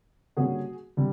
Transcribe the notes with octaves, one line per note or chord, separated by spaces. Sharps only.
D3 G3 A#3 C#4 F#4 G#4
D3 G3